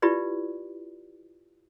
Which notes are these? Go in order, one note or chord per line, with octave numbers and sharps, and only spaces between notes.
E4 F4 G4 B4 D5